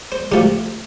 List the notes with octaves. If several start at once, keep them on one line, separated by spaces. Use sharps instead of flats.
C5
D3 F3 A3 G4